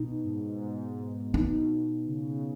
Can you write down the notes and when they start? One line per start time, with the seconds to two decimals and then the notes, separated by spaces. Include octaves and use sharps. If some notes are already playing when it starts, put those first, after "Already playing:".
Already playing: B2 D#4
0.24 G#2
0.62 G#2
1.33 B2 D#4
2.07 C#3